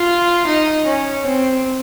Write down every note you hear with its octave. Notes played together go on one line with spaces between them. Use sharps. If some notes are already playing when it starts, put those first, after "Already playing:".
Already playing: F4
D#4
C#4
C4